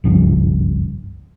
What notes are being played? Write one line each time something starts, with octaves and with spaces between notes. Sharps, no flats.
F#1 C#2 G2 F3